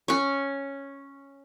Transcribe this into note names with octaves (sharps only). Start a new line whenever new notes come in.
C#4 C#5